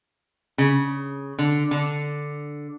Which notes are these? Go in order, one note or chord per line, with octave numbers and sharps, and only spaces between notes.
C#3
D3
D3